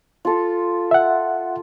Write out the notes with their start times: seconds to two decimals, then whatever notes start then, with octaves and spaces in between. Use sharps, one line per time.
0.25 F4 A4
0.91 E5 F#5